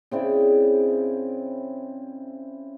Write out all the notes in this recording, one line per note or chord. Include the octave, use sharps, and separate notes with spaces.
C#3 C4 E4 D5